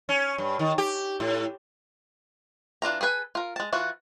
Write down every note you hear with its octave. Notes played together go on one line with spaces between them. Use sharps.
C#4
G2
D#3
G4
A2
E3 D4 F4 A#5
G#4 A4 B4 G#5
F4 A#4
G#3 A5
E3 F4 F#4